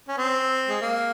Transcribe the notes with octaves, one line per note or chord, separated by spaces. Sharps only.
C#4
C4
G#3
A#3